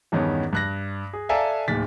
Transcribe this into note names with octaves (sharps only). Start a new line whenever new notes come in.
E2 G2 D#3 B3 C#4
G2 F#6 A#6
G#4
A4 D5 E5 F5 G#5 A#5
D1 D#2 A6 B6